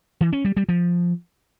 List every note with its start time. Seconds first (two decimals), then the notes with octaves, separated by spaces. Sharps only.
0.21 E3
0.33 C#4
0.45 G3
0.57 G3
0.69 F3